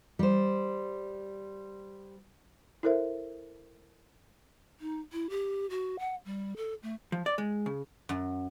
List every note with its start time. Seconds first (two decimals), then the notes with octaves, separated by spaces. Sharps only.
0.19 G3 C5
2.83 E4 A4 A#4 C5 E5
4.80 D#4
5.13 E4
5.30 G4
5.70 F#4
5.99 F#5
6.25 G3
6.57 A4
6.83 A3
7.12 F3
7.26 D5
7.38 G#3
7.66 C#3
8.09 F#2